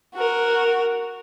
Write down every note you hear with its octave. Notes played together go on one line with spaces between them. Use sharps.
F#4 A#4